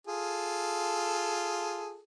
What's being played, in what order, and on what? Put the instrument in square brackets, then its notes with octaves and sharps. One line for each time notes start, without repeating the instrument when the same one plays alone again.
[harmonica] F4 G#4 A4